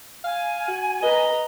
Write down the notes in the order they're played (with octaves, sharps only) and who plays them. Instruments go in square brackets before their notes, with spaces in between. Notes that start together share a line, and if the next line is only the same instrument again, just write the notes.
[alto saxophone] F5 [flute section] G#5
[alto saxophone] F#4
[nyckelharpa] B4 A#5 [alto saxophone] D#5